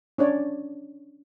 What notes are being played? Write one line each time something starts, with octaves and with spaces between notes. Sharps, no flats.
C#4 D4 C#5 D5